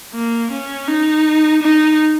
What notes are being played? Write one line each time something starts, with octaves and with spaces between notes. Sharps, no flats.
A#3
C#4
D#4
D#4